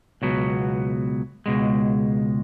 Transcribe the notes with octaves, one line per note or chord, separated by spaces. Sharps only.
C#2 B2 F#3 B3
C#2 B2 G#3